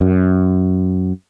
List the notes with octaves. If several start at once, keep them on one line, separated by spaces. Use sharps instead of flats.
F#2